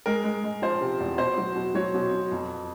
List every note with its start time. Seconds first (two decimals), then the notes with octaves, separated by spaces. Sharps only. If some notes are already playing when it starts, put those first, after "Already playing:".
0.06 G#3 A#4
0.24 G#3
0.44 G#3
0.62 F3 C5
0.81 C3
1.00 E2
1.18 B2 C5
1.38 F#3
1.56 B2
1.75 F#3 C#5
1.94 B2
2.13 B2
2.32 F2